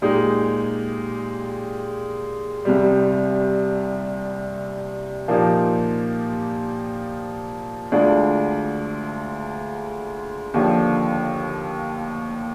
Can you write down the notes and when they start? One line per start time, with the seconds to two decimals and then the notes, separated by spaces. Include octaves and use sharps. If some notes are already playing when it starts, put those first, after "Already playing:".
0.02 A#2 G#3 D#4 G4
2.65 C2 C3 G3
5.28 A#2 F3 A#3 D#4 G4
7.92 D2 D3 G#3 D4 F4
10.54 D#2 D3 F3